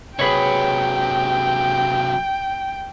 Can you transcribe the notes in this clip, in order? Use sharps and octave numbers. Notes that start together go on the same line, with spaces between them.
C3 F#3 G#4 B4 C#5 G5